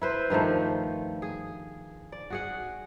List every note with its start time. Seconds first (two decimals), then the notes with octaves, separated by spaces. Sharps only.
0.02 E4 B4 C5
0.30 G2 D#3 F3 A3
1.22 G#4
2.12 D5
2.30 F#4 G#4 F#5